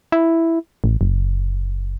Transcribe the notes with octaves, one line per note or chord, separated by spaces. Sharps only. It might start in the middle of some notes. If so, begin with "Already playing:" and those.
E4
A1
F#1